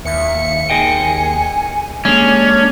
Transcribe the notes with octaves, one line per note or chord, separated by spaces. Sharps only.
D#2 E5 C#7
G#4 D#5 G5 G#5
G#3 A#3 C#4 D4 G#4